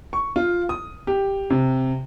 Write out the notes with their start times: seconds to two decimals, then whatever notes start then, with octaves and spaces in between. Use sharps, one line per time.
0.13 C#6
0.36 F4
0.69 D#6
1.07 G4
1.50 C3